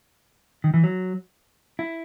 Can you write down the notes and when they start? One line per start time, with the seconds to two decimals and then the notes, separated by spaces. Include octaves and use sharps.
0.64 D#3
0.74 E3
0.84 F#3
1.79 E4